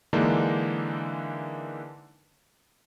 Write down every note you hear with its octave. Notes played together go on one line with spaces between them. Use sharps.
D3 E3 G#3 A#3 D4 D#4